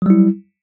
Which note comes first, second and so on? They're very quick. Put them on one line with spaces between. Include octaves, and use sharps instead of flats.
F#3 G3 E4